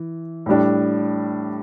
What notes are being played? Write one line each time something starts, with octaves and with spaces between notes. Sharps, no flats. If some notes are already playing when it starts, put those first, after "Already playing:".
Already playing: E3
A2 G3 D4